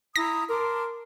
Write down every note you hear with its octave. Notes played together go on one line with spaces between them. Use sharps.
E4 A#5 D#6 A#6
A#4 A5 C6 D6